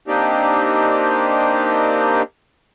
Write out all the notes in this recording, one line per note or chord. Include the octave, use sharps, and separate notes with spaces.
A#3 C4 D4 D#4 G4